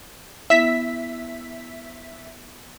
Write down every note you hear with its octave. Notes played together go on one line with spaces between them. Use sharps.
B3 E4 E5 B6